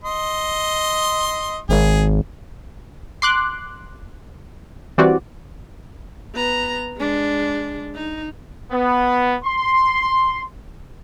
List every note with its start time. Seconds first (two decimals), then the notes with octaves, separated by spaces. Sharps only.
0.04 D#5 C6
1.69 G#1 G#4
3.22 C6 D6 F#6
4.98 E3 G3 C4 F#4 D5
6.34 B3 A#5
6.97 G#3 D4
7.95 D#4
8.71 B3
9.44 C6